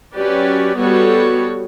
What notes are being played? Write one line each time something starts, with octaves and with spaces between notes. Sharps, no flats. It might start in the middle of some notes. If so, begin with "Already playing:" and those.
F#3 C#4 G4 B4 D5
G3 B3 F#4 A4 C#5